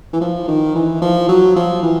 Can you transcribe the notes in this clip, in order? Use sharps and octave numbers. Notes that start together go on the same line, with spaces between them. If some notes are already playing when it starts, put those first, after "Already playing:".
E3
F3
D#3
E3
F3
F#3
F3
E3